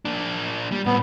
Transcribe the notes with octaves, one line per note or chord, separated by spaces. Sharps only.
A#3 D4
G3
A2 B3 C4